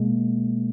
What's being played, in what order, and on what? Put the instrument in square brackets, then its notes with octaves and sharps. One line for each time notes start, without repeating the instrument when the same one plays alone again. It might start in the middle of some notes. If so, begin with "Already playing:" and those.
Already playing: [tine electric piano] B2 G#3 A#3